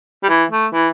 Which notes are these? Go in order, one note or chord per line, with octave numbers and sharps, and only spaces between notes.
G3
E3
A3
E3